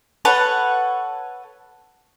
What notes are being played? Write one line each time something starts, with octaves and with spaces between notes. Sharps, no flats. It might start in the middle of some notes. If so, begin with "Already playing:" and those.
A4 B4 C#5 F#5